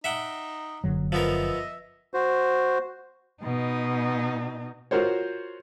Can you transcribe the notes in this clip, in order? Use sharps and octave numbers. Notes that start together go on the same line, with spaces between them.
D#4 E5 F#5 G5
F#1 D3 F#3
F3 B3 A#4 D#5 E5
F#4 C5
B2 D#4
F4 F#4 A#4 C5 C#5